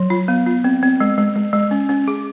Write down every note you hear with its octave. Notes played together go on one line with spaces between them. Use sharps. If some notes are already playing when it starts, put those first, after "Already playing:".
Already playing: F#3
F4
B3
F4
C4
C4
G#3
G#3
G#3
G#3
C#4
C#4
G#4